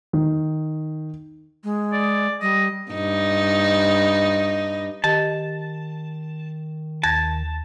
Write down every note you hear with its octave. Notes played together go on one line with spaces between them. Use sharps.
D#3
G#3
D5
G3 D#5
G2 D#4
D#3 G4 D#5 A5
D#2 A5 G#6 A#6